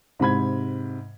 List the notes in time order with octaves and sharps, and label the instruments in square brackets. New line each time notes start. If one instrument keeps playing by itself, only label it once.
[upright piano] G#2 C3 B5 G#6